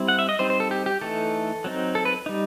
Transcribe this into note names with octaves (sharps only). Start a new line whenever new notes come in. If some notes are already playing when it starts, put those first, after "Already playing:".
Already playing: G3 C4 E4
F#5
E5
D#5
G3 C4 D#4 C5
C5
A4
G4
G4
E3 A3 D#4 A4
F#3 C4 D#4
A4
B4
G3 D#4